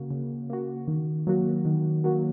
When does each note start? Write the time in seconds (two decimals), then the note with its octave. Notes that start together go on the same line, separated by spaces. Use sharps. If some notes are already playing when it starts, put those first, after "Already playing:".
Already playing: C#3 A#3 F#4
0.10 C#3
0.50 A#3 F#4
0.88 D#3
1.27 F#3 A#3 F#4
1.65 D#3
2.04 F#3 A#3 F#4